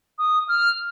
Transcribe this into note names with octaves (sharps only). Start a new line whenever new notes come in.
D#6
F6